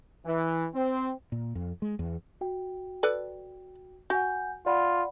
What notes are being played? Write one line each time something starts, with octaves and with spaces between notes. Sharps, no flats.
E3
C4
A#2
F2
G#3
E2
F#4 G5
A4 B4 D5
F#4 F#5 G#5 G6
F4 D5 F#5 B5